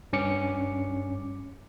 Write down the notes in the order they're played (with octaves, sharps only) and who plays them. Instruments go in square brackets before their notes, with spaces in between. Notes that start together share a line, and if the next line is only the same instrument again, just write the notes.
[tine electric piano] G2 C#4 D6 C#7